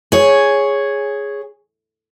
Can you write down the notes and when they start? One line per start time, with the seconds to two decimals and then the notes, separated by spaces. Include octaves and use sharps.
0.12 G#4 C#5